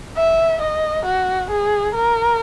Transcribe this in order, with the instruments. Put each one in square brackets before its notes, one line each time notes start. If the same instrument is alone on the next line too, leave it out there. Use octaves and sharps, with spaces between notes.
[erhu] E5
D#5
F#4
G#4
A#4